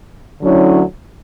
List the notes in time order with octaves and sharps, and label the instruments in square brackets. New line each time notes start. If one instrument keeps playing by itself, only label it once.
[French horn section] D2 D3 F#3 C#4 E4